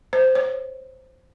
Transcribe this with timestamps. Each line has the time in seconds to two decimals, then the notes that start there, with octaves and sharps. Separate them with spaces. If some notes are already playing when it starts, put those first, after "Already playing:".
0.13 C5
0.35 C#5